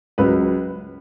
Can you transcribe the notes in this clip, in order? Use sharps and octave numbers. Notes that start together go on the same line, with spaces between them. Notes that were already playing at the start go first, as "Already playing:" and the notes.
C#2 C#3 F#3 B4